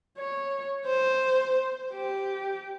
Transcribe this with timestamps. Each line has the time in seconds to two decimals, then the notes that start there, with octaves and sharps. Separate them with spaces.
0.18 C#5
0.86 C5
1.93 G4